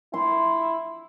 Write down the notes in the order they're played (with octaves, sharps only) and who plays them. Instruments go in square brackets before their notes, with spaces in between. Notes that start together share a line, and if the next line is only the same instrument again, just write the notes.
[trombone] E4 [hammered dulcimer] C6